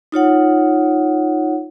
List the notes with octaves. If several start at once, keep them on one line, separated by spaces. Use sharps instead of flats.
D#4 F4 C#5 F#5